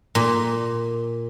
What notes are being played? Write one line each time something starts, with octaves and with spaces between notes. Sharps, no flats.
A#2